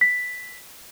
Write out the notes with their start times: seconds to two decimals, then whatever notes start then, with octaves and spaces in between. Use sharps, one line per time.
0.01 B6